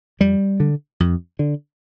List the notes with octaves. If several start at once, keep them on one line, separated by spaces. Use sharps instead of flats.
F2 G3
D3
F2
D3